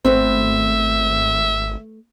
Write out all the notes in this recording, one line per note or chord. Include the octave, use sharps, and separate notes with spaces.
G#1 A3 B3 C4 F#4 E5